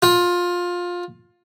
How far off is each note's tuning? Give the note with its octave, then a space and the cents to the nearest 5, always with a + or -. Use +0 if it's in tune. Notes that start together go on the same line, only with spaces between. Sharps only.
F4 +20